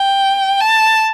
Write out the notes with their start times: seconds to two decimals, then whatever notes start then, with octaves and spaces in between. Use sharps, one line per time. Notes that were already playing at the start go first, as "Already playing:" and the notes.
Already playing: G5
0.60 A5